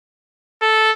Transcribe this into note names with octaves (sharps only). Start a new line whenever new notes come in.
A4